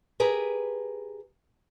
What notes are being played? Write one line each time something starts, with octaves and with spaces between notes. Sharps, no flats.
G4 G#4 A#4 B4